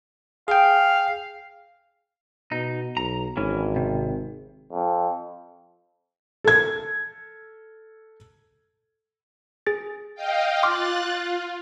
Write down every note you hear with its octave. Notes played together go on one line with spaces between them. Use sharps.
G#4 F5 G5
B2 D#4
B1 A#5
G#1 E3 C#4
C3
F2
A4 G#6
G#4 A6
D#5 F5 G5
F4 C6 D6 F6 F#6 A6
F4